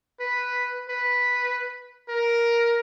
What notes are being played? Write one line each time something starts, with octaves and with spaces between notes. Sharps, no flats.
B4
B4
A#4